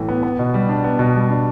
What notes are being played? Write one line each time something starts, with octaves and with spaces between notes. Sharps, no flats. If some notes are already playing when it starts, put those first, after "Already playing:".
Already playing: A2 E3
B3
B3
B2
G3
D4
B3
B2
G3
D4